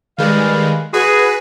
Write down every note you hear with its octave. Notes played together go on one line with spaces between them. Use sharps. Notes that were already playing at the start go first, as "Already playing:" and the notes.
D#3 G3 G#3 B4 F5
F#4 G#4 B4